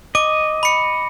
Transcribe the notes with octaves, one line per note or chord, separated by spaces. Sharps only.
D#5 D6
B5 C#7